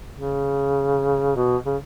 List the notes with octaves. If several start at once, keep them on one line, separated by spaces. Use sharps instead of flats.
C#3
B2
C#3